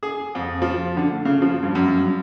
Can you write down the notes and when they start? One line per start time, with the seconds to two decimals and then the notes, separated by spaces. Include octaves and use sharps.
0.03 G#4
0.35 F2
0.62 F3
0.97 D3
1.11 A3
1.25 C#3
1.42 F3
1.63 G2
1.75 F#2
2.00 G2